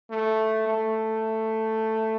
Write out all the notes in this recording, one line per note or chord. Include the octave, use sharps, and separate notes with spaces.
A3
A3